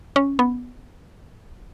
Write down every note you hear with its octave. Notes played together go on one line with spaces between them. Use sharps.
C#4
B3